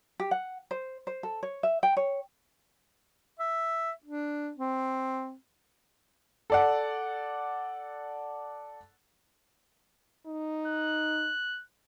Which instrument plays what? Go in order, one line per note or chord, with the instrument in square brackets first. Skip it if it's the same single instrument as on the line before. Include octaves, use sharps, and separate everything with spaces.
[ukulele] G4
F#5
C5
C5
A4
C#5
E5
G5
C#5
[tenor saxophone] E5
D4
C4
[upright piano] A4 D5 F#5
[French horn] D#4
[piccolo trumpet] F#6